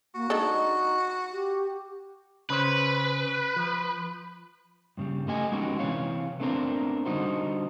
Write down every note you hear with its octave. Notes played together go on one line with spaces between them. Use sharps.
A#3 F#4
G#3 D4 D#4 A4
G4
C#3 C#4 B4 C5
F3
G2 C#3 G3
A3 G4 D#5 F#5 G#5
G#3 B3 C#4 D#4 F#4 G4
C3 E3 C#4 C#5 F5
A3 B3 C4 D4 A4 A#4
D3 G3 D#4 F#4 C5